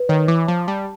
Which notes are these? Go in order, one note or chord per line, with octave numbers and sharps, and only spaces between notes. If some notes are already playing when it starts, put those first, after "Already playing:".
Already playing: B4
D#3 C#5
E3 D6
F3 A5
G3 A5